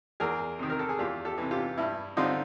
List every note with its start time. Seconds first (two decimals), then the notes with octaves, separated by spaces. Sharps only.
0.20 E2 G#4 A#4
0.59 C3 D#3
0.70 A#4
0.79 A4
0.89 G#4
0.99 E2 F4 G4
1.25 G4 A4
1.38 C3 E3
1.51 F4 G4
1.78 G2 E4
2.17 D3 G3 C4 D#4 F4